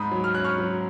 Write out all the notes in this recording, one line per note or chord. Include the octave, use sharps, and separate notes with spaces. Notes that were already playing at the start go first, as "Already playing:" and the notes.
Already playing: G#2 B5 D#6
F#3
F6
C#4 F#6
C#6 F6
F#3